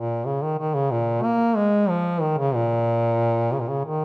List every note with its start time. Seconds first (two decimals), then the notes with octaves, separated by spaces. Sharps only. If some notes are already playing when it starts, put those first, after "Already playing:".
Already playing: A#2
0.25 C#3
0.42 D#3
0.59 D#3
0.74 C#3
0.91 A#2
1.23 A#3
1.56 G#3
1.89 F3
2.21 D#3
2.38 C#3
2.55 A#2
3.53 C#3
3.61 A#2
3.69 C#3
3.85 D#3